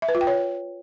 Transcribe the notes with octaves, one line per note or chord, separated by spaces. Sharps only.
E5
B4
F4
G5
C#5